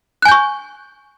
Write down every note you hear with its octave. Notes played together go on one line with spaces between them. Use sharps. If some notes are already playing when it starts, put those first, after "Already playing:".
G#5 C#6 F#6 G6